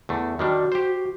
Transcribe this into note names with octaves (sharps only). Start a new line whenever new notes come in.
E2 A3
D#3 G3 D4 F#4
G4 C5